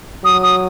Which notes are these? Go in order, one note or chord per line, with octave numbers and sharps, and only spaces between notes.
F#3 D#6
D#6